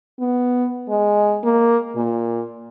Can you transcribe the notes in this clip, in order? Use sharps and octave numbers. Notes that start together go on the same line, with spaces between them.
B3
G#3
A#3
A#2